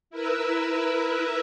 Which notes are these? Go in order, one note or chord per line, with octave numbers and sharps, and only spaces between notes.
E4 A#4 B4 E5